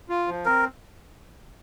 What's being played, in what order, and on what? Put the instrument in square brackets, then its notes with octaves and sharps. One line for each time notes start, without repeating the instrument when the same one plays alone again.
[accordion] F4
F3
[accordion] C4 [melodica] A#4